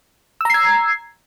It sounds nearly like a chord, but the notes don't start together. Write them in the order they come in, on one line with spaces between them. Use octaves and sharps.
E6 A#5 C7 G#6